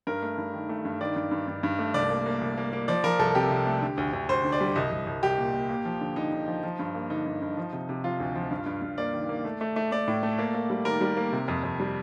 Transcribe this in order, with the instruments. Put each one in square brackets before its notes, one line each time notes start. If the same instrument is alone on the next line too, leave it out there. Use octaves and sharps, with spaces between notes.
[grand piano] G2 A#4
A3
G2
D#3
A3
G2
D#3 D5
G2
G2
G2
G2
A3
C2 D5
A#3
A#3
C2
A#3
A#3
F3 D5
F3 A#4
C2 A4
C3 G4
C3
A3
D3
D2
D2
D2 C5
D3
D5
G3
C2 D#5
C2
C2
C2 G4
A#2
A#2
A#3
F3
D3
D3 D#4
D3
F3
F3
G2
A#3
D3 D#4
G2
G2
F3
C3
C3
F3 F4
D2
F3
G2
G2
G2
A#3 D5
D#3
A#3
A3
A3
A3
A3 D5
A2
A3
A#3
A#3
G3
D#3 A#4
G3
A#3
C3
F2
F2
G3